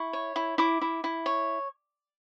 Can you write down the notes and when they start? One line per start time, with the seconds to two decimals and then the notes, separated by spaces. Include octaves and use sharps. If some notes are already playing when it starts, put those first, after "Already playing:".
Already playing: E4 C#6
0.13 C#5
0.36 E4
0.58 E4 D6
0.81 E4
1.04 E4
1.26 C#5